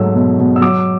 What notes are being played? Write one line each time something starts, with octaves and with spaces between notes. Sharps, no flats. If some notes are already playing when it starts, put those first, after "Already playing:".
Already playing: G#2 F#3 A3 E6
B2
B2
E6
F#3 D6